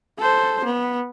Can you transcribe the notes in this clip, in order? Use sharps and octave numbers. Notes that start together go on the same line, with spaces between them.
A4 C5
B3